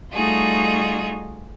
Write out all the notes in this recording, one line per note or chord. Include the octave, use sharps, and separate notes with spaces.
G3 A3 D#4 F4 F#4 G#4